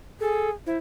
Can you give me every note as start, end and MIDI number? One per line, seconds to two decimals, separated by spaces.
0.20 0.51 68
0.20 0.50 69
0.66 0.78 64
0.66 0.75 72